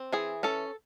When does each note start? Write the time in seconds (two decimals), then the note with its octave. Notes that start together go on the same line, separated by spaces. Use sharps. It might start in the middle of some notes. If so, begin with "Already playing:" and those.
Already playing: C4
0.13 E3 G#4
0.43 C#4 A4